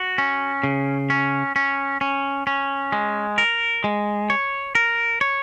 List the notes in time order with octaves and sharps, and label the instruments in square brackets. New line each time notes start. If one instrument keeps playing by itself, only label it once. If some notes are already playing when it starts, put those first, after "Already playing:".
Already playing: [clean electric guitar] F#4
C#4
C#3
C#4
C#4
C#4
C#4
G#3
A#4
G#3
C#5
A#4
C#5